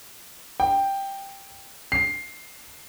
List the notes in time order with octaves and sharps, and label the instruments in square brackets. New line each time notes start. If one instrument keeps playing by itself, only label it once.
[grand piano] G5
C7